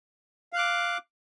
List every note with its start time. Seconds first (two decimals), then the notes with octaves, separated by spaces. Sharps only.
0.53 F5
0.56 F#6
0.58 D6